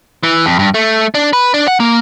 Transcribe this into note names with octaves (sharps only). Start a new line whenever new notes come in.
E3
F2
G2
A3
D4
B4
D4
F#5
A#3